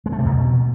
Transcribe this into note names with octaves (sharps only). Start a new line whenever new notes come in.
G#3
A3
C3
E2
B2